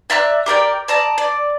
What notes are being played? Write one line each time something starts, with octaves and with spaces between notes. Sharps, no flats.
D5 E5 A#5 F#6
G4 A#4 D5 G5
D5 A5 A#5 D#6
D5